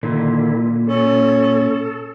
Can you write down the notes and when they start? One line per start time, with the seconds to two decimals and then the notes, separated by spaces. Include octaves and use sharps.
0.03 A#2 D3 D#3 E4
0.87 C#4 A4